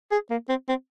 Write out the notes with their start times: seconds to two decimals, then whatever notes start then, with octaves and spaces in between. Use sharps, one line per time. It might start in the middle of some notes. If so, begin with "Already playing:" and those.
0.12 G#4
0.31 A#3
0.49 C4
0.68 C4